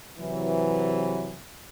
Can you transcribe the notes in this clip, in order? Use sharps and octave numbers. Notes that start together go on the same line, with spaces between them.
C3 E3 F#3